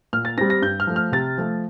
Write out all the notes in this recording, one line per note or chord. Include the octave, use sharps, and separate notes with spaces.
A#2 F6
A6
G3 C4 A#6
A#6
G2 G6
F6
F3 A3
F6
C3 A6
F3 A3